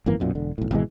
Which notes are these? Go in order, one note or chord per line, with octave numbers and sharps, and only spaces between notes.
G#1 F#2 E3 A#3
B1 F#2 A#2
E1 D3
B1 A2
G#1 B2 E3 G#3